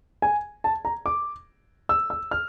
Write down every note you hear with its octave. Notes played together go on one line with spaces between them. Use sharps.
G#5
A5
A#5
D6
E6
E6
F6